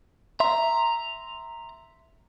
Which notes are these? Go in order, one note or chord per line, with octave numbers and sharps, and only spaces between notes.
E5 A#5 C6